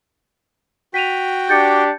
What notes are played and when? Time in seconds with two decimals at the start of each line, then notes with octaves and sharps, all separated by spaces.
0.94 F#4 G5 B6 D#7 F7
1.49 D4 G4 G6 A6 C#7